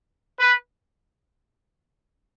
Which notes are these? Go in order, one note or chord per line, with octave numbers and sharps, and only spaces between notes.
B4